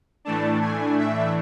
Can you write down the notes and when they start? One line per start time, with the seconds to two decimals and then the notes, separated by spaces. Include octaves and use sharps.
0.25 A2 E3 A3 D4 A5
0.62 G#5
0.98 E5